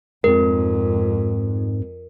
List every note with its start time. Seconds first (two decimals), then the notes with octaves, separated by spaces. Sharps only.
0.24 F2 G#2 G#3 C4 A#4